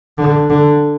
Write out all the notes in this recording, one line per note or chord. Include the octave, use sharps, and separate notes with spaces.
D3
D3